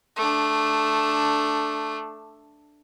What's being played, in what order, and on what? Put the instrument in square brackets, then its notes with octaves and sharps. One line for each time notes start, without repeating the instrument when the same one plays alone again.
[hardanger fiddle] A3 D4